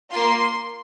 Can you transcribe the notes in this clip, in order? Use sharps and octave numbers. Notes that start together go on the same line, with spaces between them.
A#3 F4 C6